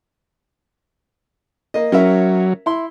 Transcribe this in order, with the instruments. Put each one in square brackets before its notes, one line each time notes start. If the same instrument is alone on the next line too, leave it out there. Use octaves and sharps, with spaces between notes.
[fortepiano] A#3 D#5
[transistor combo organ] F#3 [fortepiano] C#4 A#4 E5
[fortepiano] E4 C6